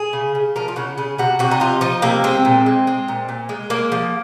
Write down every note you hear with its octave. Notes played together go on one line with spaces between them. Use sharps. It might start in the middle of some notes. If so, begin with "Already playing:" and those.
Already playing: G#4
C#3
C#3
F3 A#4
F4
C#3 F#4
C#3 G#4
C3 F#4
C3 F#4
D#4
F3 F4
F3 D#4
C3 A#3
G#3 C4
A#2
G#3
G#3
A#2
A#2
G#3
G#3 A#3
F3